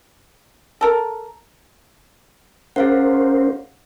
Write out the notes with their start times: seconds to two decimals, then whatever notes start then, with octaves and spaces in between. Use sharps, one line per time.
0.81 A4 A#4
2.76 C#4 G#4 A#4 C5 F5 F#5